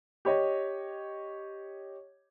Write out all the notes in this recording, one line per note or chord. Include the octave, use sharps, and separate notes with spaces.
G4 C#5 D#5